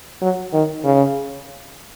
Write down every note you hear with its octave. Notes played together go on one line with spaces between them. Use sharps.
F#3
D#3
C#3